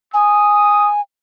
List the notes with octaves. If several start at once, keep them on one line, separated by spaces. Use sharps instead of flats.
G#5 D#6